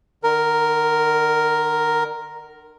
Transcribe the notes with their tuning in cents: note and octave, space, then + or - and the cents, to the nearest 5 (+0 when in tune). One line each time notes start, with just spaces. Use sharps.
D3 +45 A#4 +0